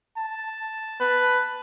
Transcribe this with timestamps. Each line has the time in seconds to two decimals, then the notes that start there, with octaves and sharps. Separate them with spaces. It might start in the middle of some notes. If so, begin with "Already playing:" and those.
0.17 A5
1.00 B4